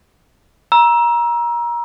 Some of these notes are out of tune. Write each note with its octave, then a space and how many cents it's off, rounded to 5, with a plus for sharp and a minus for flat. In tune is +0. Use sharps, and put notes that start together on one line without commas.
A#5 +25 E6 +0